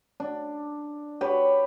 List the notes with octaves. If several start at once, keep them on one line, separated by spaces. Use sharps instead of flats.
D4
G4 B4 C#5